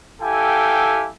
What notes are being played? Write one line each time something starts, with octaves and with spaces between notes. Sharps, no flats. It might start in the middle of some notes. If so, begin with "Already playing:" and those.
E4 G4 A4 F5 G5 G#5